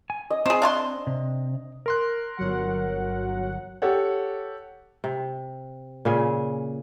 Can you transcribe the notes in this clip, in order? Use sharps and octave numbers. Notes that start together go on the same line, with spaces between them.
G#5
D#5
C4 G#4 C5
D4 F5 C6
C3
A#4 C6 F#6
G1 F#3 F#5
G4 A4 C#5 F#5
C3
A#2 C#3 G#4